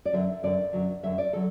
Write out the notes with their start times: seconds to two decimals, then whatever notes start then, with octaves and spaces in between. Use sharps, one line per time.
0.05 D5
0.13 F#2 D3 F#3 E5
0.43 F#2 D3 F#3 D5
0.73 F#2 D3 F#3
1.03 F#2 D3 F#3 E5
1.18 D5
1.33 D3 F#3 A4